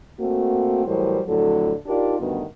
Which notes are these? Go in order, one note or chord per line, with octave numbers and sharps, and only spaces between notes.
A3 A#3 C4 F#4
A2 E3 F#3 G3 A#4 C5
F2 A2 D3 F#3 A4
D4 D#4 F4 G4 A#4 D5
D2 G2 D#3 B3 F#4